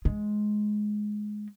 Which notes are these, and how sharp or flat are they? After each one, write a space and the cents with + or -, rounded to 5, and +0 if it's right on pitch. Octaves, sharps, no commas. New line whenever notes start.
G#3 +15